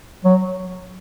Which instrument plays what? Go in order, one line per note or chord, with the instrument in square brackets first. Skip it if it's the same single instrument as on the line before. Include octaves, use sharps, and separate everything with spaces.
[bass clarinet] F#3